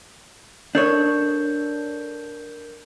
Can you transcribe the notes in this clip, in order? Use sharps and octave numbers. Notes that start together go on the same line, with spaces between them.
D4 A4 A#4 C#5 G6